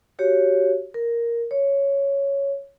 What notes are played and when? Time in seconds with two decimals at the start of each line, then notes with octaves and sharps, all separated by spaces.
0.19 F#4 G4 C#5
0.94 A#4
1.51 C#5